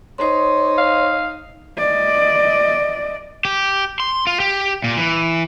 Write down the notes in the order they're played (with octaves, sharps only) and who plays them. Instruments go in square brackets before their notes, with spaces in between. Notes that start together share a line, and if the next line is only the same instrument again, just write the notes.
[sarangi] D#4 [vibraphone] C5 C6 [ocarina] C#5
[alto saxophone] F5
[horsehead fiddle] D5 D#5
[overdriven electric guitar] G4
C6
F4
G4
A#2
E3